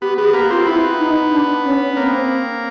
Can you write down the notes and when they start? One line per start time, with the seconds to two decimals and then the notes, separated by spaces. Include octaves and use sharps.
0.02 B3 G4
0.18 B3 G#4
0.33 A#3 G4
0.50 C4 F4
0.66 B3 E4
0.99 D#4
1.31 D4
1.65 C#4
1.97 A#3 C4